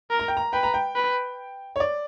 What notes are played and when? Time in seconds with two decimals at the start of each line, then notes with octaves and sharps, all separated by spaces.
0.10 A#4
0.19 A#5
0.28 G5
0.37 A#5
0.53 B4 G5
0.63 A#5
0.74 G5
0.95 B4
1.76 C#5
1.80 D5